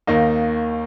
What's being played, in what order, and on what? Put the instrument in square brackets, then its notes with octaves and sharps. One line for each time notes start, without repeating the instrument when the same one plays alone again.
[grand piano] D#2 D#3 A#3 D#4